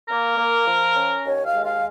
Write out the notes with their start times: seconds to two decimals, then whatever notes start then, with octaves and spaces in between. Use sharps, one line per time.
0.09 A#3 A#4
0.37 A#3
0.67 F3
0.95 C#4
1.25 D#2 C#5
1.45 F5
1.54 G#3
1.64 F5